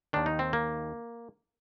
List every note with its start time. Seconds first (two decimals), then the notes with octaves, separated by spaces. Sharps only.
0.13 D#2 D#3 D4
0.26 D#4
0.39 C4
0.53 A#3